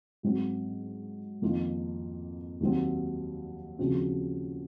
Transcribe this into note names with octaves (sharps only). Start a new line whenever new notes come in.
G#2 F#3 C4 F#4
F2 D#3 A#3 F4
D#2 D#3 F#3 C4
D#2 C#3 F3 C4 F#4